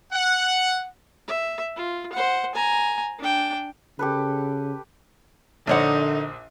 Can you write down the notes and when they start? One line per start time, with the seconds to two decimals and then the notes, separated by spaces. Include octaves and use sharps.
0.12 F#5
1.27 E5
1.76 F4
2.12 C5 F#5
2.55 G#5 A#5
3.19 D4 G5
3.99 C#3 G4 A4 B4
5.67 A#1 D3 D4 D#4 A#4 C5 C#5 F#5